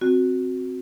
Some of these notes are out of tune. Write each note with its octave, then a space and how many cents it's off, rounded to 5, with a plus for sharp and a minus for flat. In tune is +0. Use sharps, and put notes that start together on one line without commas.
C4 +0 F#4 -10